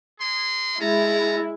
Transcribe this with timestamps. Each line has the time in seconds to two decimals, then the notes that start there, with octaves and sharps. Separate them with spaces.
0.19 G#3 G#4 C6
0.80 G#3 C#4 E4 A5 A#5